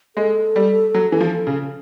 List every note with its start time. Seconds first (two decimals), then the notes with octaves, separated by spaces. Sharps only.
0.16 G#3 A4
0.56 G3
0.94 F#3
1.12 E3
1.21 F3
1.47 C#3